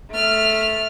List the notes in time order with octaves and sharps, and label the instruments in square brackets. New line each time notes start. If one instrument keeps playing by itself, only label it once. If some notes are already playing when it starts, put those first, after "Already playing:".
[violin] A3 F6